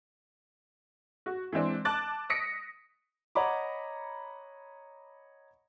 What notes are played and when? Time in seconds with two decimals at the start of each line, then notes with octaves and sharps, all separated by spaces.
1.26 F#4
1.52 E3 G#3 C4 D4
1.85 A5 D6 F#6 A6
2.30 D#6 A#6 B6 C#7 D7
3.35 C#5 D#5 F#5 A#5 B5 D6